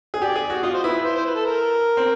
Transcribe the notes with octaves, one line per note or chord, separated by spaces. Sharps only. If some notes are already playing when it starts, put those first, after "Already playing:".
G#4
G4 D5
G#4
F#4
F4 D#5
C5
E4 B4
B4
C5
C5
B4
A4
A#4
C4